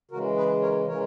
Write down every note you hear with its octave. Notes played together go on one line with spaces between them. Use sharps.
C#3 E3 G#3 F#4 A#4
G#4 B4
A#4 C#5
C#3 E3 G#3 A#4 C#5